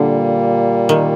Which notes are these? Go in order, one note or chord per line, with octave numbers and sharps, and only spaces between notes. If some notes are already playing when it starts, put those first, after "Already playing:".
Already playing: A#2 D3 G3 A#3
D#3